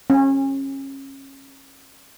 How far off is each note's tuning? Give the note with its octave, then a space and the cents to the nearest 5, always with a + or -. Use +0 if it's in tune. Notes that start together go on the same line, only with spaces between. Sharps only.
C#4 -30